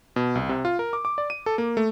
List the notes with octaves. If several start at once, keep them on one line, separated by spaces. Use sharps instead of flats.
B2
C2
C3
F4
A#4
D6
D6
D5
D#7
A4
A#3
A3